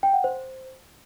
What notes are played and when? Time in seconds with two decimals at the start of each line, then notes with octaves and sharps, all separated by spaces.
0.03 G5
0.14 F#5
0.24 C5